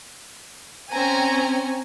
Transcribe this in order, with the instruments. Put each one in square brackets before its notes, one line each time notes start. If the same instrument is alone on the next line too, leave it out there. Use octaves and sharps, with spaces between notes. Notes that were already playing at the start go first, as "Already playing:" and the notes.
[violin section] C4 C#4 G#5 A#5